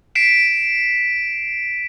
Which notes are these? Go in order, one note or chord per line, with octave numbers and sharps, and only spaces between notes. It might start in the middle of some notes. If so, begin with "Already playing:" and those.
B6 C7 D7 E7